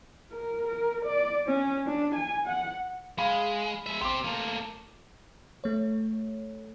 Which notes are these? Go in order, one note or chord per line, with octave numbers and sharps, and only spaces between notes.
A#4
A#4
D5
C#4
D4
G#5
F#5
G#3 F5 B5
G#3 E5
C4 G4 C6 D6
A3 A#3
A3 C#5